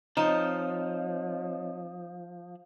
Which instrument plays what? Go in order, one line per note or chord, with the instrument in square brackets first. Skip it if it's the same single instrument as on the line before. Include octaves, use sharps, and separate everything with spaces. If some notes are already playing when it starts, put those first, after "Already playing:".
[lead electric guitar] F3 [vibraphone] C4 C#5 D#5 [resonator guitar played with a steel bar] D#4